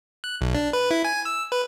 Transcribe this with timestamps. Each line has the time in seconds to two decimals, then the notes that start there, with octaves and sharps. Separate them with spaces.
0.24 F#6
0.41 B1
0.55 D4
0.73 B4
0.91 E4
1.05 G#5
1.25 E6
1.52 B4